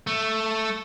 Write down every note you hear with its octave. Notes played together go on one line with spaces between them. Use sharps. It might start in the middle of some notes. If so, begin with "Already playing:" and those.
A3